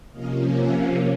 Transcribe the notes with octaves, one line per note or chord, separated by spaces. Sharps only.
C3 F3 A#3 C#4 D#5 F5
E5 F#5